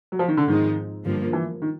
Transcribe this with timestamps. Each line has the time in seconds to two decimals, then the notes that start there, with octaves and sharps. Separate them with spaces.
0.12 F#3
0.19 F3
0.28 D#3
0.37 D3
0.47 G#2 D#3 F3 G#3 C4 D#4
1.05 G2 D3 F3 A#3
1.33 E3
1.62 D#3